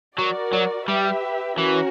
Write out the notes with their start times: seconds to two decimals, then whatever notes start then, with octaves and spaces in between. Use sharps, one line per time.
0.18 F#3 F#4 A#4 D5
0.53 F#3
0.87 G3 G4 B4 E5
1.58 E3 C#4 F#4 A#4